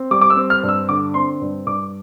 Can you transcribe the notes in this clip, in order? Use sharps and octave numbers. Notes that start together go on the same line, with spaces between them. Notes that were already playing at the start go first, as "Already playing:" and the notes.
Already playing: C4
G3 D6
D6
E6
C4
F6
G2
E6
D3 D6
C4 C6
G2
G2 D6